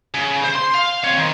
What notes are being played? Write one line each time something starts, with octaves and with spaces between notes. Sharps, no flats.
C#3
C5
C6
F5
C4 C#5
D#3